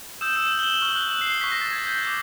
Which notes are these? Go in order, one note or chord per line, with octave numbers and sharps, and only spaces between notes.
D#6 E6 G6 E7
E6 E7
F#7
G7
F#7
G7
C#6 F6 F#7
G7
F#6 F#7
F#6 F#7
C7
C#6 F#6 B6
A#6
A6
G#6
G6
G6
D6